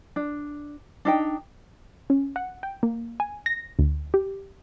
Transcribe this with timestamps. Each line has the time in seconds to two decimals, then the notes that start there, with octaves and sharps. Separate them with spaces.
0.16 D4
1.05 D4 D#4 G5
2.10 C#4
2.36 F#5
2.63 G5
2.83 A#3
3.20 G#5
3.46 A#6
3.79 D2
4.14 G4